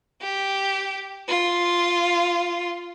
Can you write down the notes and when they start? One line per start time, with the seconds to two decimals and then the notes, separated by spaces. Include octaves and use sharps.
0.21 G4
1.29 F4